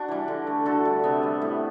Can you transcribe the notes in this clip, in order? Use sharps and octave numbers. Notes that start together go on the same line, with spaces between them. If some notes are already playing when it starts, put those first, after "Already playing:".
Already playing: D4 F#4
E3 G3
D3
A3
D3 F#4 A4
G3
C3 B3
G3
A2